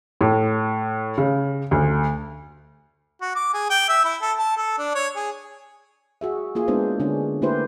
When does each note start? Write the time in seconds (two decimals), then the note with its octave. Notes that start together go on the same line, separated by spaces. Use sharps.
0.21 A2
1.18 C#3
1.71 D2
3.21 F#4
3.36 D6
3.54 G#4
3.70 G5
3.89 E5
4.05 E4
4.22 A4
4.38 A5
4.57 A4
4.78 D4
4.95 C#5
5.16 G#4
6.21 F#4 G#4 E5
6.55 A#3 F4 G#4
6.68 G#3 B3 D4 E4 F4 C5
7.00 D3 C#4 D4
7.42 A3 A#3 E4 G4 B4 C5